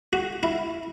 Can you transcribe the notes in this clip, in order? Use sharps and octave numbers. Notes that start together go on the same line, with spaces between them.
F#4
E4